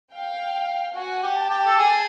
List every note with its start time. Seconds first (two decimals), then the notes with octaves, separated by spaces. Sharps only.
0.12 F5 G5
0.95 F#4 F#5 G#5
1.23 G4
1.37 G5 A5
1.50 G4
1.67 A4
1.79 G#4